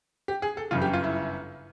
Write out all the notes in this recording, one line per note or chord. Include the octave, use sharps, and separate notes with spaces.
G4
G#4
A4
G1 F#2 C#3 F4
G4
F4
E4